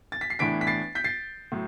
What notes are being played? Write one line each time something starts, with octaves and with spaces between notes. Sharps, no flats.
A6
B6
C7
A2 E3 B3 D4 B6 D7
B6
A6 C7
G6 B6
A6 C7
A2 F#3